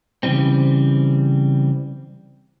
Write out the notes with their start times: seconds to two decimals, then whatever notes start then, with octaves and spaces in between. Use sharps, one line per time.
0.23 C#3 E3 G3 C4